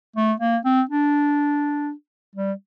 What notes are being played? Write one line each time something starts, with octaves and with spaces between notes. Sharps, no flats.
A3
A#3
C4
D4
G3